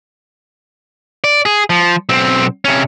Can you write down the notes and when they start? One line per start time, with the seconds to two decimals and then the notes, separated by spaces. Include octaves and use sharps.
1.24 D5
1.45 G#4
1.70 F3
2.09 B1 C4
2.65 C3 C#4